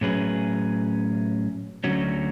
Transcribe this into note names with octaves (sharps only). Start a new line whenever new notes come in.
A2 F#3 C#4 G#4 B4
D2 D3 F#3 C#4 F#4